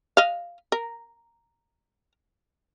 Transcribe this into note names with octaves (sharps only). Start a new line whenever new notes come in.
D#5 F5
A#4